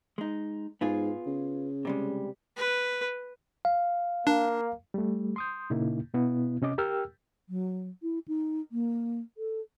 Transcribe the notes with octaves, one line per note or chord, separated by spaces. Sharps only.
G#3 D#4
G#2 B3 F4 G#4
C#3
C3 G3 G#3
B4
F5
A#3 D4
G3 A3
C6 D#6 G6
A#2 C#3 A#3 D#4 E4
B2 B3 E4
C3 C#4 D#5 D6
G4 A#4 G5 E6 F6
F#3
E4
D#4
A#3
A4